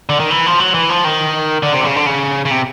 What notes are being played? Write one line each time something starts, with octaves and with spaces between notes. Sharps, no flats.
D3
D#3
E3
F3
F#3
E3
F3
D#3
D3
C3
D3
C#3
D3
C#3
C#3
C3